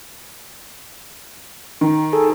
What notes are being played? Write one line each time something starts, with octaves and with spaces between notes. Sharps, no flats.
D#3
G#4 A4